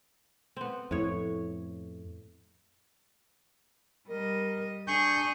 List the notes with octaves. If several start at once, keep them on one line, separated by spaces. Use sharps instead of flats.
B3 C4
F2 A2 C#5
G3 A#4 D#5
D4 G#4 C#6 G6